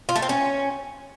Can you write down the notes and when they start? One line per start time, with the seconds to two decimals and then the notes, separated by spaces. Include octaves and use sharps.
0.09 F4
0.16 A3
0.22 C4
0.29 C#4